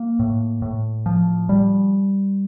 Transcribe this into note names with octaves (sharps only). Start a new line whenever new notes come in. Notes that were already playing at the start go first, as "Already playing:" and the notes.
Already playing: A#3
A2
A2
F3
G3